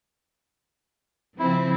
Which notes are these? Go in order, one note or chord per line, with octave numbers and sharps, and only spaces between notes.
C#3 F3 C4 E4